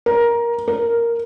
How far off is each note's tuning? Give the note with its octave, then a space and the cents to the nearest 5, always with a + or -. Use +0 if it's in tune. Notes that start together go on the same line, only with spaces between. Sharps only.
A#4 +15
A#4 +0